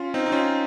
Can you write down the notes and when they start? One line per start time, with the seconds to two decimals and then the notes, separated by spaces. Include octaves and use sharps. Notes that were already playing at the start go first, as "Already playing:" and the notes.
Already playing: C#4 F4
0.14 C4 D#4
0.26 D#4
0.32 C#4 F4